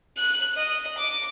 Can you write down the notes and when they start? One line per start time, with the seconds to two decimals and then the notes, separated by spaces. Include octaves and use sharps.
0.17 F#6
0.57 D#5
0.98 D6